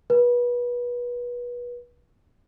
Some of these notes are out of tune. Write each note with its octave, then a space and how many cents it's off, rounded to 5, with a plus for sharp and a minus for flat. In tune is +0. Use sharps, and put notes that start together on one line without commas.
B4 -30